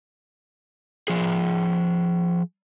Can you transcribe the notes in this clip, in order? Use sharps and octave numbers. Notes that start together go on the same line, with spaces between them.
F3 G#4